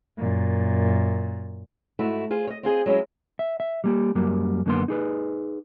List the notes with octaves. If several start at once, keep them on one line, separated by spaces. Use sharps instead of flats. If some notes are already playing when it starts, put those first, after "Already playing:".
F#2 A#2
G#2 A3 E4 F#4
F4 G#4 C5
C#5 D#5
C4 F4 G#4 D#5
F#3 G#3 C#4 E4 F4
E5
E5
G3 A#3 G4
F#2 F#3 G3 A#3
F#2 D3 A#3 B3 C6
D#4 G#4 B4